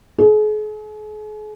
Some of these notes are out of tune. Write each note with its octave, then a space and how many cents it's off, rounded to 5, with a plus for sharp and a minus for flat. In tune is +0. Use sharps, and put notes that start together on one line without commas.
G#4 +40